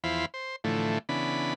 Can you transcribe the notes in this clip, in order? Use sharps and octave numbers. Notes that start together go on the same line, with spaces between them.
E2 F3 E4 C5 F5 B5
C5
A2 D3 E3 F3 A3
C#3 E3 B3 D4 B5